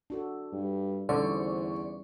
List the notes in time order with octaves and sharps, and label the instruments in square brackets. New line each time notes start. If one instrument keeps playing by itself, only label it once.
[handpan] D4 F#4 A4
[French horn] G2
[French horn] E2 [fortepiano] D3 [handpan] G3 C#4 D#4 [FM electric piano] C5 D5 C#6